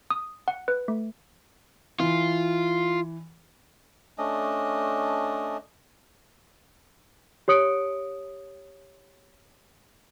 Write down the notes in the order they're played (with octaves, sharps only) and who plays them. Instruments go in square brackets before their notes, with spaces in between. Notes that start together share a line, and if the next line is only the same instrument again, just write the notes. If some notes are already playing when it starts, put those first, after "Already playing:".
[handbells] D#6
F#5
B4
A3
[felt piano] E3 [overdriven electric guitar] F4
[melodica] A3 C#4 D4 D#5
[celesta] G4 C#5 D#6 C#7 D7